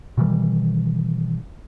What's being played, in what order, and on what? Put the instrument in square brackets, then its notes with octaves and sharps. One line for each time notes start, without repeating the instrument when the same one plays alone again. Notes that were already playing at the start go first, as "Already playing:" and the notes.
[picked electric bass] B2 D#3 E3 G3